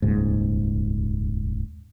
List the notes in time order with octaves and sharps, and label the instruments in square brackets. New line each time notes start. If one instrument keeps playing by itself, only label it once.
[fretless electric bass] D#1 C#2 G#2